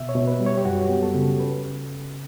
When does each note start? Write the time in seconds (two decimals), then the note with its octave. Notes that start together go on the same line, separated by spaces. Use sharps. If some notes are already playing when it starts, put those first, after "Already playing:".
Already playing: B2 E5
0.09 C#5
0.15 B2
0.27 B4
0.40 G3
0.46 C#5
0.57 G4
0.65 F#2 F#4
0.83 G4
0.89 B3
1.03 A4
1.15 C#3
1.40 B4